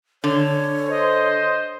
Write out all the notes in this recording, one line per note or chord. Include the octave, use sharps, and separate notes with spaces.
D3 C#5
C5 D#5